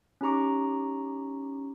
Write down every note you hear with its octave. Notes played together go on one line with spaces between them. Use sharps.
C#4 D#4 G4 A#5 C#6 D6